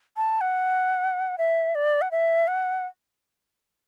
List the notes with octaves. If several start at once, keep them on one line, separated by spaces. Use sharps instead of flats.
A5
F#5
E5
D5
F#5
E5
F#5